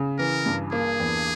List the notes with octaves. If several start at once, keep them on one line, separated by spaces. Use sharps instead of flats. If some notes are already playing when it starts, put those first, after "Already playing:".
Already playing: C#3
E3 A#4
G2
A#3 G#4
E2